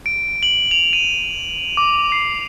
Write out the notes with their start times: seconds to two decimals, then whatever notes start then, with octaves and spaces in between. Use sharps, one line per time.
0.06 D7
0.43 F#7
0.71 F7
0.93 D#7
1.77 D6
2.12 C7